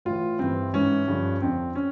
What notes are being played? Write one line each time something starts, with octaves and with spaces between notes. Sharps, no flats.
A2 E3 F4
G2 E3 C4
G#2 E3 C#4
G2 D3 F3
F2 D3 F3 C4
C#4